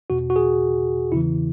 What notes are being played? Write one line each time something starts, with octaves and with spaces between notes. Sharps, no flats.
E2 B2 F#4
F#4
G#4
E2 C#3 E3 E4